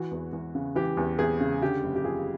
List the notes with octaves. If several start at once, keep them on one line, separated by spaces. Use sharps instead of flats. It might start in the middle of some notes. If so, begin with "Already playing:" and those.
Already playing: E3 F#4
E2
E2
C#3
E3 G4
E2
E2 G#4
C#3
D3 G4
F#1
G4
F3 G#4